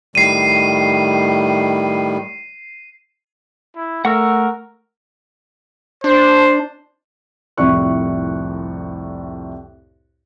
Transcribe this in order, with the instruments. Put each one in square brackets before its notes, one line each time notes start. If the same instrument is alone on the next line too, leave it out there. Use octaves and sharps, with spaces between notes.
[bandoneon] A2 D#3 G3 [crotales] C7 D#7
[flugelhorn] E4
[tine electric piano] A3 [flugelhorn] A#4 [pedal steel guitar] F#5 C#6 E6
[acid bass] D4 [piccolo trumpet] C5
[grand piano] C2 F2 A2 D5 C#6 F#6